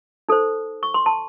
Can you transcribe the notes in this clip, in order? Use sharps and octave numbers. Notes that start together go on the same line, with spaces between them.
D#4 A4 C5
C#6
C6
A5